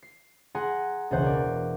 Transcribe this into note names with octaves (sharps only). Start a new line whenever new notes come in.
C7
G#4 F#5 G#5 A#5 C6
E1 C#2 G#4 C5 F#5 G6
A#4 D5